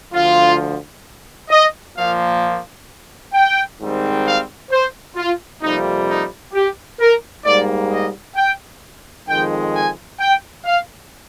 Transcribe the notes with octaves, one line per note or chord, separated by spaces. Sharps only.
D2 D3 F3 F4
D#5
A#2 F3 A#3 F5
G5
G#2 D#3 G3 C4
F5
C5
F4
F2 C3 G3 A#3 D#4
D#4
G4
A#4
G#2 G3 A#3 D5
D#5
G5
F2 D#3 G#3 G5
G#5
G5
F5